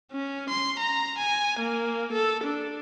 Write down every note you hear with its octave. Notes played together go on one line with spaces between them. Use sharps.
C#4
C6
A#5
G#5
A#3
A4
D4